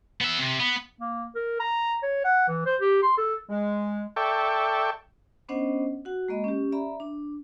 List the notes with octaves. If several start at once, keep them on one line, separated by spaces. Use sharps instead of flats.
B3 E5
C3
B3
A#3
A#4
A#5
C#5
F#5
E3
C5
G4
C6
A4
G#3
A4 D5 E5 G5 C#6
B3 C#4 D4 C5 D#5 F#5
F#4 F#5
G#3 A#3 D#5 B5
C#4 G4
D5 E5 A#5 B5
D4